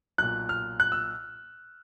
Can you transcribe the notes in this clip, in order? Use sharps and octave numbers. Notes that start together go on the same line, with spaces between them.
B1 A#2 F#6
F6
F#6
E6